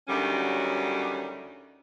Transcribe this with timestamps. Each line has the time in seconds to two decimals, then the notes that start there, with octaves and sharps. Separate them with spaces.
0.08 D2 D#3 F#3 G3 C#4 F#4